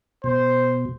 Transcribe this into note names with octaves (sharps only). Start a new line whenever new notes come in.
B2 C5